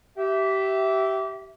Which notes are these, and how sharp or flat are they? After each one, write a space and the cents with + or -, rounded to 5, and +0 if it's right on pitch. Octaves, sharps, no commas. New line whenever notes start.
G4 -25 E5 +0